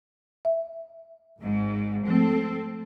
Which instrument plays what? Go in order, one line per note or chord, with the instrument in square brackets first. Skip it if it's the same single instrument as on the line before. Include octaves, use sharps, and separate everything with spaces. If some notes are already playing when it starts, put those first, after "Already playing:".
[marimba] E5
[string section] G#1 G#2
[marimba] F3 A3 [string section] C4 A4